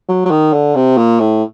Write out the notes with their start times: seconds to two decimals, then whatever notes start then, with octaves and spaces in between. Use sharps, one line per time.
0.09 F#3
0.25 F#3
0.31 D#3
0.53 D3
0.75 C3
0.97 A#2
1.20 A2